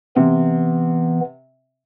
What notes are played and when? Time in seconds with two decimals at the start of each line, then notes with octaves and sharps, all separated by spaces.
0.16 C3 E3 B3